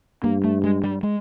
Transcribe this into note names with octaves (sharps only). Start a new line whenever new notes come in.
G2 A#3
A3
G#3
G3
G#3